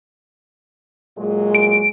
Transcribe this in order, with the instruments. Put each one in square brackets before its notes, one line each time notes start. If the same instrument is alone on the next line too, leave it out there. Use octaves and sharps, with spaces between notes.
[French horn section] A#2 F#3 G#3
[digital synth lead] D7